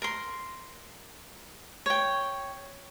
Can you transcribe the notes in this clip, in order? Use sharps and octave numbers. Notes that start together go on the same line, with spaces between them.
A#4 C6
C#5 G5